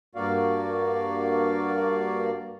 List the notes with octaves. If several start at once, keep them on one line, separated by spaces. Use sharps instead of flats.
G2 A#3 F#4 D5 F5